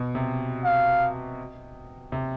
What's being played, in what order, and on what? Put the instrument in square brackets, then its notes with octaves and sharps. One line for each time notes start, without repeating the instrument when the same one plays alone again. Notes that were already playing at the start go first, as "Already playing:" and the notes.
Already playing: [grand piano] B2
C3
[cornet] F5
[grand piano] C3